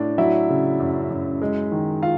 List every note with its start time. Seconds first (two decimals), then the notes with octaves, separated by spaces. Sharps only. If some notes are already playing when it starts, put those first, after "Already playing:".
Already playing: A2 D4
0.18 F#3 E4 E5
0.49 C#3
0.80 F#2
1.10 F#2
1.42 G#3
1.72 D#3
2.03 F4 F5